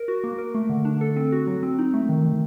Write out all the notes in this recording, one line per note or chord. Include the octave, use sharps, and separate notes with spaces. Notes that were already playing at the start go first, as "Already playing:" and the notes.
Already playing: A#4
F#4
A#3
A#4
A3
D3
D4
A4
C4
F#4
F#3
C4
D#4
A3
D#3
D#3